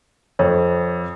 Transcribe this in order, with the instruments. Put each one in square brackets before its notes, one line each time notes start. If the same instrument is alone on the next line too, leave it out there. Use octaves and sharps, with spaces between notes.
[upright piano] F2 [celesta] C5 C#5